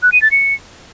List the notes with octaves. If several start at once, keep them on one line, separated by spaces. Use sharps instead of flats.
F#6
D#7
A6
C#7